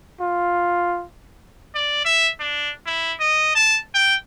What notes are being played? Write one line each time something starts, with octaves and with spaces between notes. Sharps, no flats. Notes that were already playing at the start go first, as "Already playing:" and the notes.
F4
D5
E5
D4
E4
D#5
A5
G5